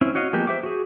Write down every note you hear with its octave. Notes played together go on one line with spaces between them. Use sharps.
C4 C#4 E4
F#4 C#5 D#5 F5
F3 G#3 A#3 B3 G4
C5 E5 D6
F#4 G#4